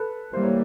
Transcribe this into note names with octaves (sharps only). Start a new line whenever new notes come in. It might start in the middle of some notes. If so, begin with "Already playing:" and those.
Already playing: A4 B4
E3 G3 A#3 C5
C#5